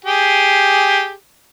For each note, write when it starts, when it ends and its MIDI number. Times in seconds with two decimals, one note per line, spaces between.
0.05 1.11 67
0.05 1.11 68